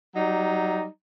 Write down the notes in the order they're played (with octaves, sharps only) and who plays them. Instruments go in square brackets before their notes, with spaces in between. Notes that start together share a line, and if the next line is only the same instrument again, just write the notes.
[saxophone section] F#3 G3 D#4